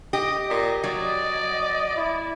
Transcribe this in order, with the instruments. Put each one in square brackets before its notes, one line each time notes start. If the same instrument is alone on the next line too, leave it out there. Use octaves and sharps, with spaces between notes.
[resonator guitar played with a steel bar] G4 [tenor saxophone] D#5
[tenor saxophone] A#2 [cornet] D#5
[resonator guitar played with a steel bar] F#3 [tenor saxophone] D5
[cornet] E4